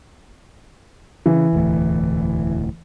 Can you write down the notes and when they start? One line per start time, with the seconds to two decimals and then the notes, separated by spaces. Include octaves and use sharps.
1.26 C#3 E3
1.53 E1 D2 A2